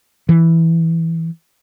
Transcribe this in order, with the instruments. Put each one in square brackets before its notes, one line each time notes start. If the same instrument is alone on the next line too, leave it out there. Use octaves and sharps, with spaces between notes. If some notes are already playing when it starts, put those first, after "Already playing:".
[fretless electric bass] E3